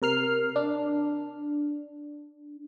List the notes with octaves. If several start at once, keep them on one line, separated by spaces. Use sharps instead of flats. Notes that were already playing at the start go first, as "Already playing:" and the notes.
C3 A#4 F6 C7
D4